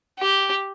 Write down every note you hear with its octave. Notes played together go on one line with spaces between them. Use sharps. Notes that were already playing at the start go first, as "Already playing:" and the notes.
G4